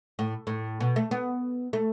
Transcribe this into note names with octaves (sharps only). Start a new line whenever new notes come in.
A2
A2
B2
A3
B3
A3